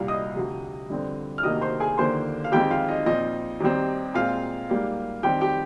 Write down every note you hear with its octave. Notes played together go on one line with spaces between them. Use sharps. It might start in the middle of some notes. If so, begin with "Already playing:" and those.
Already playing: C2 A#2 G3 F5
D#5 D#6
D2 C3 F3
G2 D3 F3 C4
F6
D2 C3 D#3 A#3 D#5 D#6
C5 C6
G#4 G#5
D#2 D3 F3 A#3 C5 C6
F5
F2 D#3 G#3 C4 G4 G5
F4 F5
D#4 D#5
A#2 F3 C4 D#4 D#5
D#2 D#3 G3 C4
A#2 G#3 C4 F4 F5
G#2 G3 A#3
F2 D#3 G3 C4 G4 G5
G4 G5